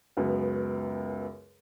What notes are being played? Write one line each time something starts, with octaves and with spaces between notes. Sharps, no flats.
C#2 F#2 B3